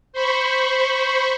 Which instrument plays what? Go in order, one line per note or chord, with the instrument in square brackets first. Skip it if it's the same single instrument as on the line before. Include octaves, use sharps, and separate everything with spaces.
[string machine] C5 B5 C#6